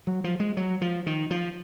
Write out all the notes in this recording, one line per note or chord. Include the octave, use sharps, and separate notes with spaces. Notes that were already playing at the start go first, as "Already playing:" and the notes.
F#3
F3
G#3
F#3
F3
D#3
F3